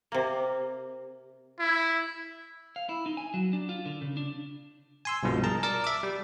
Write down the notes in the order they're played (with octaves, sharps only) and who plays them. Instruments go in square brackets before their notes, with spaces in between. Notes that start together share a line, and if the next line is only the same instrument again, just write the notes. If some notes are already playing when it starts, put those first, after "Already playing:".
[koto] C3 A#3
[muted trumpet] E4
[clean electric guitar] F5
E4
D#4
G#5
F#3
D4
F4
D3
C#3
D4
[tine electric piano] G#5 C6 E6
C2 G2 B2 F3 G#3
G#4 A#4 A5 A#5
A#4 D5 A5
E5 D6
G3